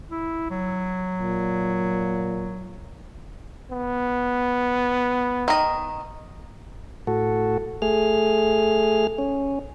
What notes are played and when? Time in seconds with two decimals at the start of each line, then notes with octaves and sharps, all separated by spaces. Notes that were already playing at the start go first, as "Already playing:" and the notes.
0.11 E4
0.51 F#3
1.21 A#2
3.71 B3
5.48 D#3 D#5
7.07 A2 F#4 A4
7.82 A3 G#4 F6
9.18 C#4